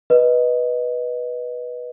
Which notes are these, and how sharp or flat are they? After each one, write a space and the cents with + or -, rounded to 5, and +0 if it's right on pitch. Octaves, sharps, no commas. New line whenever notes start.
B4 -10 D#5 +0